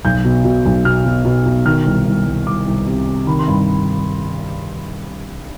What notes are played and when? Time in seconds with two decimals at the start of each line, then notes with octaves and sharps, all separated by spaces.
0.05 B1 G6
0.24 B2
0.44 B2
0.65 B1
0.85 B2 F6
1.05 B2
1.25 B2
1.46 B2
1.66 D#3 F6
1.86 C2
2.06 C2
2.26 C2
2.47 C2 D6
2.66 C2
2.87 C3
3.07 C3
3.27 D#3 B5
3.39 C6
3.47 G2 B5